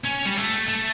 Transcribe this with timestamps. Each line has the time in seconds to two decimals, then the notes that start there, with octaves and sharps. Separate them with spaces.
0.04 C#4
0.25 G3
0.36 A3
0.68 A3